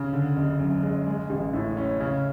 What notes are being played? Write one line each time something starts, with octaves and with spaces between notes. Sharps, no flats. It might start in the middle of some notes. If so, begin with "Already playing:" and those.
Already playing: C#3
D3
F#1
F#2
G#3
G#3
A1
A2
C#4
C#3